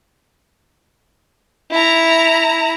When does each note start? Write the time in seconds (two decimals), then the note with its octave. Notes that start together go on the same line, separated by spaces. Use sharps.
1.71 E4 A#5